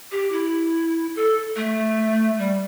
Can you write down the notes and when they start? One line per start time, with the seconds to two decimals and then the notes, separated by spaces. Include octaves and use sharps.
0.11 G4
0.32 E4
1.16 A4
1.56 A3
2.38 G3